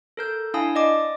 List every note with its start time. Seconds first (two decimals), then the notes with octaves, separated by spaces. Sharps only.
0.17 A4 A#4 G6
0.54 D4 E4 F5 G#5 A5 D#6
0.75 D5 D#5 D6 D#6